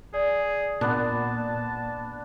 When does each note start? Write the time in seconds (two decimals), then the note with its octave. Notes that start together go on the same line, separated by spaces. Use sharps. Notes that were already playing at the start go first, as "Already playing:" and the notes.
0.14 G#4 D5
0.81 A#2 B3 D4 A5